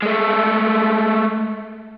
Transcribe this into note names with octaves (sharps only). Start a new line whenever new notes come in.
G#3 A3